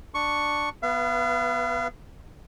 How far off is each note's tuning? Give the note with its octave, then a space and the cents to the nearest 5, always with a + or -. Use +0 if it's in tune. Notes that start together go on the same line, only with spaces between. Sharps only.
D4 +10 C#6 +0
B3 +0 B4 -25 F5 -40